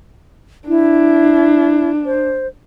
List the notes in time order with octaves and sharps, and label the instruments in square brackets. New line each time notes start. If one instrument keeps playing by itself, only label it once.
[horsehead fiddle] D4 [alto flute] E4
[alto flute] C5